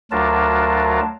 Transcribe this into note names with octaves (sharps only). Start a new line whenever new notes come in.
D2 F#3 D4 F4 A#4 A5